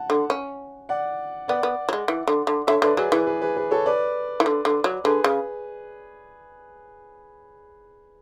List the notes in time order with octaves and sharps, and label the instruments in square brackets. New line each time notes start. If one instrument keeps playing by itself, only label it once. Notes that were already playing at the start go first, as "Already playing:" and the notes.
Already playing: [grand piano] F#5 A5
[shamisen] D3
C#4
[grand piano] D5 F#5
[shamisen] B3 [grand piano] D5 F#5
[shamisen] B3
F#3
G#3
E3
D3
D3
[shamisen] D3 [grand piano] C#5 E5
[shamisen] D3 [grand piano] B4 D5
[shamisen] F#3 [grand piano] G#4 B4
[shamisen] E3 [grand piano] G#4 B4
[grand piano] G#4 B4
G#4 B4
G#4 B4
A4 C#5
B4 D5
[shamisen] E3
D3
D3
F#3
[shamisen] D3 [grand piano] G#4 B4
[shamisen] C#3